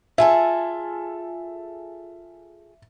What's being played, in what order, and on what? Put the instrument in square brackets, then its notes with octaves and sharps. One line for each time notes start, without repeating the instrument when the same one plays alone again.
[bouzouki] F4 G#4 A4 [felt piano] E5